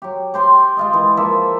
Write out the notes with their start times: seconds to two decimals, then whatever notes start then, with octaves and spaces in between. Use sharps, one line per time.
0.02 F#3 G4
0.34 G4 C5 C6
0.77 G#3 F4 D#5
0.93 E3
1.17 F3 A#3 D5 E5